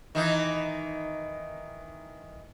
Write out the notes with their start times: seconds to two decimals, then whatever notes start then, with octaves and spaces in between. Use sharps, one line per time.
0.15 D#3 E3 D#4